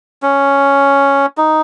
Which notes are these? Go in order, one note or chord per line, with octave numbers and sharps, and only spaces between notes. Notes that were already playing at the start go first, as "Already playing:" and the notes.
C#4
D#4